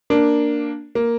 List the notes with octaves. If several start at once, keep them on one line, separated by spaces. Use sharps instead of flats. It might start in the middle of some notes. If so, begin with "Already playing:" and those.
A#3 D4
A#3